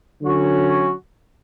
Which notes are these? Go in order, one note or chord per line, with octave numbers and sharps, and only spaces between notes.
D3 F#3 C#4 F#4 C#5